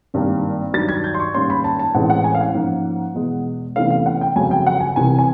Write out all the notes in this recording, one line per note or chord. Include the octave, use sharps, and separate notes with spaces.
G#1 G2 D#3 G3 A#3
G2 D#3 F#3 A6
G#6
G6
C6
C#6
G#2 D#3 G3 A#3 C#4 C6
B5
A5
A5
A1 A2 E3 G#3 C4 F#5
F#5
G#5
F5
F#5
G#2 F3 A#3 C#4
E2 B2 G#3
E2 C3 E3 A3 C#4 F5
F5
F#5
G5
G1 F2 C#3 F#3 G#5
G5
F#5
G#5
C2 C3 E3 G#5
G#5